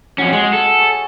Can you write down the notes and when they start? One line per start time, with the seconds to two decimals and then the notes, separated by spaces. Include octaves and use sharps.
0.18 F2 C#4 F#4 F#5 G5
0.33 G#3 G#4 D#5
0.53 A4
0.79 C#5